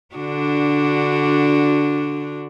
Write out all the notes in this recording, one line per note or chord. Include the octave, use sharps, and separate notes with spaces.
D3 D4 F#4